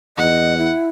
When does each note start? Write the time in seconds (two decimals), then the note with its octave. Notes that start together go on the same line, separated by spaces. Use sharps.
0.18 E2 D#5 F#5
0.58 E4